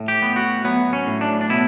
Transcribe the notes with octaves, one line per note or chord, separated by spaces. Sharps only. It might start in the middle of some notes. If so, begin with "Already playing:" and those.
Already playing: A2
G4
B3
F#4
F#3 B3
C#4
A2
D4
D4
B2 E4